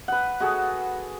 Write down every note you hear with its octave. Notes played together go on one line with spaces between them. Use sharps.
B4 F#5
F#4 G#4 A4